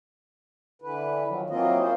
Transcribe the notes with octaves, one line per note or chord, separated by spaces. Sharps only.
D3 E3 B4
D#3 F3 F#3
E3 F#3 A#3 C4 F4 D#5
A#3 C#4 F4 C5